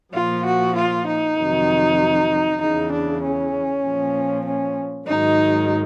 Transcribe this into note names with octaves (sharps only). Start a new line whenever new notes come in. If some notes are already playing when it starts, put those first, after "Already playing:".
A#2 F3 F4
F#4
F4
D#4
F2 C3 D#3 F#3
E2 C#3 E3 D#4
D4
C#4
A#2 F3
C#4
G#2 D#3 F#3 D#4